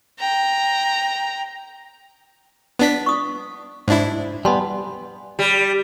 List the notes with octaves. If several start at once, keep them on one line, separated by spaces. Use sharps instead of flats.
G5 A#5
B3 D4 B6
C#6 D#6
G#2 D4 E4 C5
G3 B3 G#5 A5 C6
G3